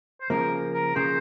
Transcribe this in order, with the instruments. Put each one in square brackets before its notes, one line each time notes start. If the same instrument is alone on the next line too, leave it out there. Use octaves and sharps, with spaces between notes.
[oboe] C5
[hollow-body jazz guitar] C#3 F3 A#3 [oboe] A#4
[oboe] A#4
[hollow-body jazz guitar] C#3 F3 A#3 [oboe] C5